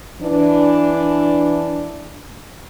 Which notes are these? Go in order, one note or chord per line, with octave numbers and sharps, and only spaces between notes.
E3 D4